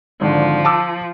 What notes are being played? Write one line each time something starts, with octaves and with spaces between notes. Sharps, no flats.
G#1 D3 F3
A5 D6 E6